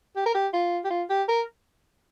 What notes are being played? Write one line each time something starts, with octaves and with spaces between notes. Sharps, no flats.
G4
A#4
G4
F4
G4
F4
G4
A#4